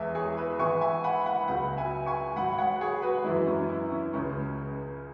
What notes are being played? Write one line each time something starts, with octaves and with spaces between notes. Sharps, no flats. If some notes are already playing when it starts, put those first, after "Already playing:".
Already playing: E2 E3 G#3 E5 G#5
G#4 C#5
B4 E5
G#2 E3 G#3 G#5 C#6
E5 G#5
F#5 B5
F#5 B5
C#2 C#3 F#3 F#5 B5
E5 G#5
G#5 C#6
G#2 F#3 F#5 B5
C#5 F#5
G#4 C#5
F#4 B4
F#2 E3 G#3 E4
C#4
E4
C#4
C#2 C#3 G#3 C#4